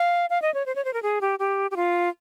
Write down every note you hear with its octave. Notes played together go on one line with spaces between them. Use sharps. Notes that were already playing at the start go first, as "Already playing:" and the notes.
Already playing: F5
F5
D#5
C#5
C5
C#5
C5
A#4
G#4
G4
G4
G4
F4